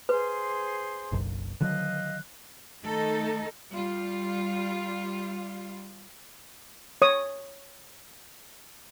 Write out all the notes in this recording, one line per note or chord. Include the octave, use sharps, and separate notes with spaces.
G#4 B4 C5 C6
F#1 B1 F#2
D3 D#3 F#3 D#5 F5 F#6
D#3 A3 D#4 A4
G3 F4
C#5 D#6